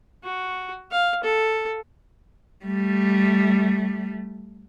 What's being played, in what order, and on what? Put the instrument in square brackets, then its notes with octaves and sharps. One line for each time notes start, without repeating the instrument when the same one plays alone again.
[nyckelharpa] F#4
F5
A4
[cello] G3 A3